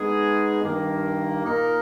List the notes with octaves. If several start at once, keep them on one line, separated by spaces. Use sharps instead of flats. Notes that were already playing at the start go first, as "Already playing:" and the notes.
Already playing: G#3 B3 D#4 G#4
G2 D#3 A#3
A#2 A#3 D#4 A#4